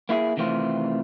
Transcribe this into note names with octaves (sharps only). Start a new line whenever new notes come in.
A#3 E4 F4 G#4
C3 D#3 E3 A3 C4 F4